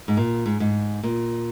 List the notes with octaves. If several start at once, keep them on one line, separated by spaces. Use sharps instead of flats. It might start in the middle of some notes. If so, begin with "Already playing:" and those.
G#2
A#2
G#2
G#2
A#2